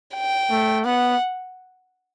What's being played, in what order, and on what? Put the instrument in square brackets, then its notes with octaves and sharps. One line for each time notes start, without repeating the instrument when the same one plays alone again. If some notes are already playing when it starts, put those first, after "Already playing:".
[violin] G5
[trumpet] A3
[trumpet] B3 [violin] F#5